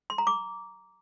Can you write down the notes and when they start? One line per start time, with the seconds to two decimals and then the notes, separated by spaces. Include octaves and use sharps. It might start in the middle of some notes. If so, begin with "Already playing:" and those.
0.10 C6
0.18 A#5
0.27 D6